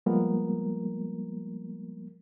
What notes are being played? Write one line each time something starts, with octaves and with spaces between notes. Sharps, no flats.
F3 G3 G#3 A#3 B3 A#4